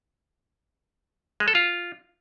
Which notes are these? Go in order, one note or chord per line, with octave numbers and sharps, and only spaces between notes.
G#3
A4
F4